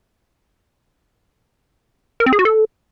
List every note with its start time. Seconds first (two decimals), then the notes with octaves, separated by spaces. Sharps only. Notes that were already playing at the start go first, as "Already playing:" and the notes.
2.20 A#4
2.26 C4
2.33 G#4
2.39 F#4
2.45 A4